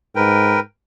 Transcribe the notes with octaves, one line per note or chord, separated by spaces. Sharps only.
G#2 A#4 B4 G5